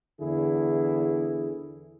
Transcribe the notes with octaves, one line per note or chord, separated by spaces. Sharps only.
E2 D3 E4 G#4